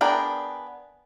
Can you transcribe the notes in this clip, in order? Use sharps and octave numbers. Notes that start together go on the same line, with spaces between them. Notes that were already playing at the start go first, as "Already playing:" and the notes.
B3 D4 G#4 A#4 G5